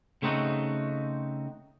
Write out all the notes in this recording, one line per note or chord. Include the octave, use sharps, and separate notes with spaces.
C#3 A3 C4 D#4 F#4